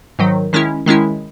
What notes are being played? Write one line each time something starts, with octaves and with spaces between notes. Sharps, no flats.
G#2 D#3 F#3
D#3 G#3 C#4 E4
D#3 G#3 C#4 E4